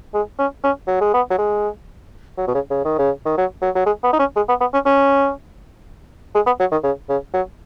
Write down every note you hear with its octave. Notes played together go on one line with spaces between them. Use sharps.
G#3
C#4
C#4
F#3
G#3
B3
F#3
G#3
F#3
B2
C#3
C#3
D#3
C#3
D#3
F#3
F#3
F#3
G#3
B3
D#4
C#4
G#3
B3
B3
C#4
C#4
G#3
B3
F#3
D#3
C#3
C#3
F#3